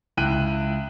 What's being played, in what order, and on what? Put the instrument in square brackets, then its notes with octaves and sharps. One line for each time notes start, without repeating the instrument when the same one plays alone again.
[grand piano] C#2 E4 G5 F#6 D#7